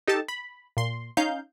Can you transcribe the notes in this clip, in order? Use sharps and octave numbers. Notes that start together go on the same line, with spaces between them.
D#4 G4 A4 A5
B5
A#2 C6
C#4 D#4 F5 G6